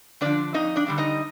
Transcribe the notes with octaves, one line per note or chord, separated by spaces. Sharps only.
D3 F3 D4 D5
F2 D#4 D#5
D4 D5
D3 G3 D4
D#4 D#5